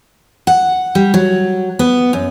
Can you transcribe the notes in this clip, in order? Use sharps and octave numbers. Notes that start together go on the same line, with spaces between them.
F#5
G3
F#3
B3
F#2